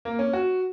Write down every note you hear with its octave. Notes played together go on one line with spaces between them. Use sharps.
A#3
C#4
F#4